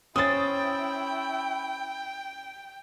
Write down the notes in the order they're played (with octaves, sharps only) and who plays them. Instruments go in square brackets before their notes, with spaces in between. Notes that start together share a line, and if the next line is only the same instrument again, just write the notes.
[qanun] C#4 C5 [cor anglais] E4 [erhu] G5 [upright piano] D#6 A6